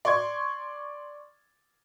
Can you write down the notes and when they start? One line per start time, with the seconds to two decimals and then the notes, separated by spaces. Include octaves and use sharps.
0.05 D5 C6 C#6 G#6